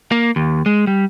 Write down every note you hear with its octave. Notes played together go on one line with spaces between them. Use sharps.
A#3
D#2
G#3
G3